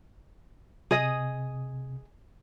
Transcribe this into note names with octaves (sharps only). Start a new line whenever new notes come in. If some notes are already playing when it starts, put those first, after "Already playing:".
C3 G#4 D#5